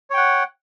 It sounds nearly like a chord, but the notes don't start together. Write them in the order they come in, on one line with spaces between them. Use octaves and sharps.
C#5 G5 F#5